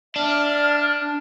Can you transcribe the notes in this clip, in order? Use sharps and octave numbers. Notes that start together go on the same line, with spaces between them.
D4 E5 F6